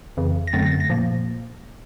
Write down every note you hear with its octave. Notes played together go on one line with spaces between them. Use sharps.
F2 C#3 E3
A#6
F#2 D3 F#3 A3 C4 A6
A#6
A6
A#6
A#2 F3 A#3